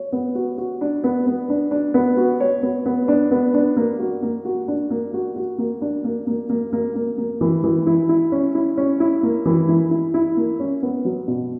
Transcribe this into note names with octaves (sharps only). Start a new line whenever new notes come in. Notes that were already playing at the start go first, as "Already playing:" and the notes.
Already playing: C#5
B3
F#4
F#4
D4
B3
B3
D4
D4
B3
F#4
C#5
B3
B3
D4
B3
D4
A#3
F#4
A#3
F#4
D4
A#3
F#4
F#4
A#3
D4
A#3
A#3
A#3
A#3
A#3
A#3
E3
E3
E4
E4
C#4
E4
C#4
E4
A#3
E3
E4
E4
E4
A#3
C#4
B3
F#3
B2